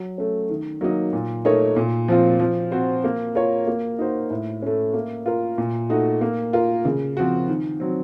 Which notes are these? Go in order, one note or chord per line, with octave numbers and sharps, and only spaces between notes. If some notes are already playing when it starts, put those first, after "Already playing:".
Already playing: F#3
A3 C#4
D#3
F#3 A#3 D#4
A#2
A3 D#4 A#4 C#5
A#2
F3 C4 F4
F3
C4 F#4 C5
A#3
F4 A#4 C#5
A#3
D#4 F#4 C5
A2
A3 C#4
A#3
F4 A#4
A#2
A3 D#4 F#4
A#3
F4 A#4
C#3
F3 C4 F#4
D#3
F#3 C4